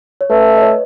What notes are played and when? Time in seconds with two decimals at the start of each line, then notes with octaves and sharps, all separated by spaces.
0.21 C#5
0.30 A3 B4
0.57 D#5
0.61 C#5